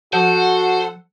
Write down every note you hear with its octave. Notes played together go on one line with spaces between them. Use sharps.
F3 F#4 A4 C5 F#5